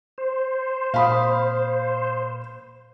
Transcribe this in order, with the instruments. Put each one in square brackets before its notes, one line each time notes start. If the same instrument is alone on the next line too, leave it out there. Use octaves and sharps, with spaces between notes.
[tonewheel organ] C5
[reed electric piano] A#2 [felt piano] F5 B5 D#6